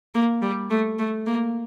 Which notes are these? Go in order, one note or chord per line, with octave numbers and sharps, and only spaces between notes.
A#3
G3
A3
A3
A#3